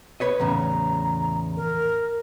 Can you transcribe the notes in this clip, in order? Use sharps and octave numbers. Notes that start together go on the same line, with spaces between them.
B4 C#5 D#5
E2 A2 C#3 A#5
A#4